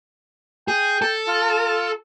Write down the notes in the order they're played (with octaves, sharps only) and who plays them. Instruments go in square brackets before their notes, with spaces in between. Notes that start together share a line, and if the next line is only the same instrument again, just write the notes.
[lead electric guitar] G#4 [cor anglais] G5
[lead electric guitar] A4
[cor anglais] F4